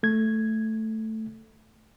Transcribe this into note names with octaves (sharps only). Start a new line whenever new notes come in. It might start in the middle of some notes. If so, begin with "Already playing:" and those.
A3 G#6